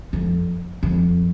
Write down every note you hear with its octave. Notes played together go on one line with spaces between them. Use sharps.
F2
F2